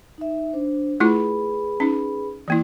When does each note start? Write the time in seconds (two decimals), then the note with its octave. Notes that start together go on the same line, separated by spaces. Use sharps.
0.18 D#4 E5
0.53 D4 C5
1.00 A3 E4 F4 G#4 B4 B5
1.80 C#4 D#4
2.48 E3 A#3 E4